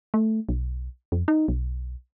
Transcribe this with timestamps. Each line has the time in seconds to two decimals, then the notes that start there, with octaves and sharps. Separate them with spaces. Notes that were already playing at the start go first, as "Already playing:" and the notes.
0.14 A3
0.49 B1
1.12 F2
1.28 D#4
1.48 B1